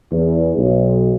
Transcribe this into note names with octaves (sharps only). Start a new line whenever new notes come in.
E2
B1